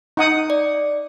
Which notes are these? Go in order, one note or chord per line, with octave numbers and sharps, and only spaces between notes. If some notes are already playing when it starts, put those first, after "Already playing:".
D#4 F#5 D#6
D5